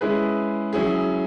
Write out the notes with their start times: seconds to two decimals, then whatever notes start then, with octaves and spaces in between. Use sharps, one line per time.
0.01 G#3 C#4 E4 G#4 B4
0.73 F#3 C#4 E4 G#4